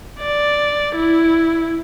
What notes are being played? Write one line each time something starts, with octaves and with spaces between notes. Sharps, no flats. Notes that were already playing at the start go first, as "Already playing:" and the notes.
D5
E4